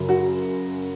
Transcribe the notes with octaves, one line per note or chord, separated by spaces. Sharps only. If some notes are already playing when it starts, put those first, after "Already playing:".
Already playing: F#2 C#3 F#3
F#4